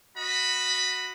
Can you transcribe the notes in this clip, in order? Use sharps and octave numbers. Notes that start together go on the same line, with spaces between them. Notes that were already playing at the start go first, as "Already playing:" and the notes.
F#4 D#5 B5